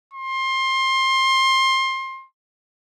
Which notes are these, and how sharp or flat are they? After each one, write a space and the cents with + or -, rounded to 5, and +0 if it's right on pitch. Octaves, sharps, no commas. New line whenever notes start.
C6 +25